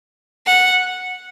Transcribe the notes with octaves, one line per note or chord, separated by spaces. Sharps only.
F#5